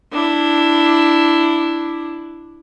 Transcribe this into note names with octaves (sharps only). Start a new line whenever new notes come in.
D4 E4